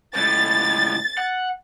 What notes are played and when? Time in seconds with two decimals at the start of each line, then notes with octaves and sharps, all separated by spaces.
0.16 C#2 A2 A6
1.18 F#5